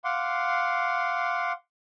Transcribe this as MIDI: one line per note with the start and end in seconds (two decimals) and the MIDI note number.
0.05 1.52 77
0.05 1.52 78
0.05 1.52 84
0.05 1.52 86